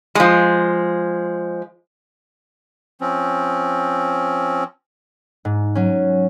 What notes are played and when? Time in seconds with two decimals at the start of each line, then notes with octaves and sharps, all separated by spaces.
0.15 F3 G#3
3.01 F3 C4 C#4
5.45 G#2
5.75 F#3 C#4